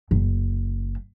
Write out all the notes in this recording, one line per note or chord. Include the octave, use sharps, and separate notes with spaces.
F#1